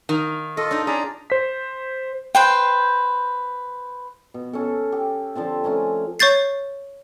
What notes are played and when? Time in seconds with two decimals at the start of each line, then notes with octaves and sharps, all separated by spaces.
0.09 D#3 F5
0.57 F4 A4 D#5
0.71 D4 D#4
0.87 C#4 G#4 D5 A#5
1.30 C5 B6
2.35 B4 C5 G5
4.34 B2
4.53 C#4 A4
4.92 G4
5.35 D3 F3 C4 A5
5.64 A3 C#4 G#5 A#5
6.19 C#5 C#6 G6 A6 C7